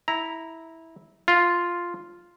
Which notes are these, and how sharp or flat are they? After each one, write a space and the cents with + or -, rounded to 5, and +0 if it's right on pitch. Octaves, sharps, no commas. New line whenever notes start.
E4 -15 A#5 +0
F4 +0 F5 +0